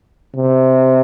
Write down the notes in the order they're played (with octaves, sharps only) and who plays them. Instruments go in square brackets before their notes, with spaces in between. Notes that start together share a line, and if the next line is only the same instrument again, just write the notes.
[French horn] C3